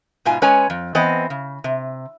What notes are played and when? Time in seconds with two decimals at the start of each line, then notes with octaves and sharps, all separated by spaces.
0.25 G#2 B2 F4 G#5
0.42 G#3 C#4 B4 C#5 G#5
0.70 F2
0.95 E3 B3 C4 D#5
1.30 C#3
1.64 C3